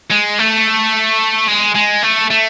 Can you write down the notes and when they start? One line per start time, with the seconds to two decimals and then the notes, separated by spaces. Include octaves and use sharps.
0.11 G#3
0.39 A3
1.48 G#3
1.75 G#3
2.03 A3
2.30 A3